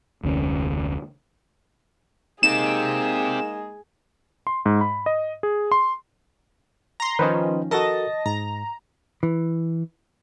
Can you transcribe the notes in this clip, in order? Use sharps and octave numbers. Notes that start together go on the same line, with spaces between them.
F1 D2 C#4
G#3 A#3 C4 D#4 G4 G#4 E7
C6
G#2
B5
D#5
G#4
C6
A#5 C6
D#3 F3 C#4 B4 C5 D#5
F#4 A4 A#4 D#5 A5 A#6
G#2 A#5
E3